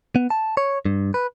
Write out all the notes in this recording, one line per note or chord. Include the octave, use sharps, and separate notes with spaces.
B3
A5
C#5
G2
B4